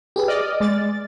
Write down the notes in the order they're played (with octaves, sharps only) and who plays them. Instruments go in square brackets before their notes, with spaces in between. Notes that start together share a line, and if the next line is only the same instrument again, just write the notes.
[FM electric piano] G4 G#4 B4
[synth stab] D5 D#5 [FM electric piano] F6
[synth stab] G#3 D5 A6